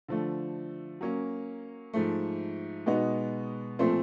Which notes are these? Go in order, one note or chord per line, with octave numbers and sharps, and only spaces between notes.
D3 F3 A3
F#3 A#3 C#4
G#2 F3 A3
B2 G#3 B3 D#4 F#4
A#2 F3 A3 C4 F4